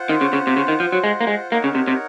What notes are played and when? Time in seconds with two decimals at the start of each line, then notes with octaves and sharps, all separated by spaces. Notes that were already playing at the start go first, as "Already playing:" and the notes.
Already playing: F4 C5 F#5
0.09 D#3
0.21 C#3
0.33 C#3
0.47 C3
0.57 C#3
0.68 D#3
0.80 F3
0.92 F#3
1.04 G#3
1.21 A#3
1.27 G#3
1.51 A#3 D#4 A#4 C#5 F#5
1.64 C#3
1.75 C3
1.88 C3